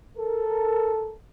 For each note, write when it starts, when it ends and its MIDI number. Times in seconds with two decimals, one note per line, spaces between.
0.18 1.13 69
0.18 1.13 70